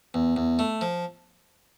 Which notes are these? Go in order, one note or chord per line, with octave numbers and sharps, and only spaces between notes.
E2
E2
A3
F3